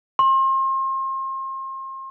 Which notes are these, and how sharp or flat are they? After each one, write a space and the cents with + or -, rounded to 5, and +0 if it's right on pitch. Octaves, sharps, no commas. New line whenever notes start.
C6 +35